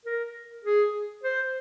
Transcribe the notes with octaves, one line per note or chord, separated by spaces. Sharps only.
A#4
G#4
C5